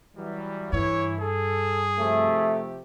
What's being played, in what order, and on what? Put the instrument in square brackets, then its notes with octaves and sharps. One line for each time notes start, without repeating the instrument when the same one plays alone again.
[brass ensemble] E3 F#3 G3
[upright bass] G2 [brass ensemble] E3 E4 [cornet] C#5
[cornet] G#4 [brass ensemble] A4
[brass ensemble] C3 F3 G4 [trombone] A3